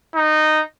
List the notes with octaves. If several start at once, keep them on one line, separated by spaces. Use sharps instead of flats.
D#4